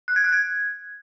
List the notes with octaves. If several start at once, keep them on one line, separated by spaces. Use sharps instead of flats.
F#6
G#6
F#6
G#6